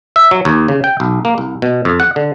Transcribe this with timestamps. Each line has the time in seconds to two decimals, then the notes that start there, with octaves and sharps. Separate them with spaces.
0.16 E5
0.31 F#3
0.45 D#2
0.68 C#3
0.84 G5
1.00 B1
1.25 A#3
1.38 C2
1.62 B2
1.85 F2
2.00 F#5
2.16 D3